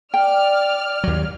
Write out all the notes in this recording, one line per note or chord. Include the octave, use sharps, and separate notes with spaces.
D5 G5 F6
D#2 F#3